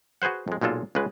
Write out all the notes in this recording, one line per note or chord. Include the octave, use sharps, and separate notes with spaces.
F#4 G#4 B4 C5 F#5
F2 G#3
B1 A#2 G#3 F4 A4
C#2 C#3 G#3 B4